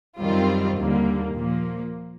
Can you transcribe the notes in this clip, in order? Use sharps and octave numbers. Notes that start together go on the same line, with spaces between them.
F#2 D#3 G3 C4 F4
D#2 D3 G3 A#3
A#2 F3 A#3